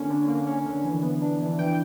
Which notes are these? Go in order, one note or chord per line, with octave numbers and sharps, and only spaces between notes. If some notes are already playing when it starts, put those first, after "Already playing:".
Already playing: D3 A#3 C#4
D3
A#3
C#4
D3
E3
B3
D4
E3
E3 G5